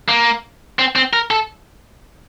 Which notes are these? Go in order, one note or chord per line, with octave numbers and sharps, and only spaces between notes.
A#3
C4
C4
A#4
A4